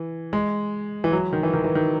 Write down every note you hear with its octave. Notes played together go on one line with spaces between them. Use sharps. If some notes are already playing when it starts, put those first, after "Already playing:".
Already playing: E3
G#3
E3
F#3
D#3
E3
D#3
E3
D#3